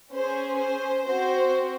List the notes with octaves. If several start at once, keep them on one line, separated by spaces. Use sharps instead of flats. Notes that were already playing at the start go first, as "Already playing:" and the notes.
C#4 G#4 C5
C5
C4 F#4 C5